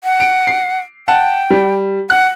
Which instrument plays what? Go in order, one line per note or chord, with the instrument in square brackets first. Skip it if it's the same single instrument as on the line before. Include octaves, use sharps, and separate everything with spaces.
[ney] F#5
[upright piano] D7
C7
[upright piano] F#5 A5 [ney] G5
[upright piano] G3
[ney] F#5 [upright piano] F#6